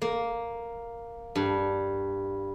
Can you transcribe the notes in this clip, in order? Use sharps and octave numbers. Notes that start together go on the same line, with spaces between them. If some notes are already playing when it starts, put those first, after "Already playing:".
A#3
G2